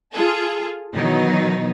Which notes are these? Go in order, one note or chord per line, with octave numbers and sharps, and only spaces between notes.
F4 G#4 A4
B2 D#3 E3 F#3 D#4